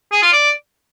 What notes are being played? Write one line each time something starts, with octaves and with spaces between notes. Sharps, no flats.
G#4
F4
D5